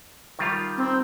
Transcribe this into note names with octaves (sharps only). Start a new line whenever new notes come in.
D#3 G3 F4
C4